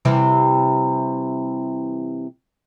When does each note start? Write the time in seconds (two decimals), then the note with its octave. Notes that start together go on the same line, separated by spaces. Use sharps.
0.05 C3 E3 G3